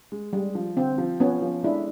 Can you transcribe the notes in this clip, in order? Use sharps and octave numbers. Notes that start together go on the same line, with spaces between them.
G#3
G3 G#3
F3
D3 C4
F3
F3 B3 C#4
F3
G#3 D4 E4